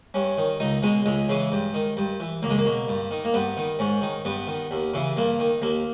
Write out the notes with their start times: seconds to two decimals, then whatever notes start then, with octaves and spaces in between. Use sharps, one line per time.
0.14 G2 C#4
0.38 D#3
0.60 C#2 D#4
0.83 B2 G#3
1.06 C#2 G#3
1.29 C#3 E3
1.52 G2
1.74 D#3
1.97 G2
2.20 E3
2.43 C#2 A#3
2.50 G#3
2.58 A#3
2.66 B2
2.88 G2
3.11 D#3
3.24 A#3
3.34 G2 B3
3.57 D#3
3.79 G#2 C#4
4.02 D#3
4.25 G2 B3
4.47 D#3
4.71 D#2
4.94 C#3 E3
5.16 G2 A#3
5.39 D#3
5.62 D#2 A#3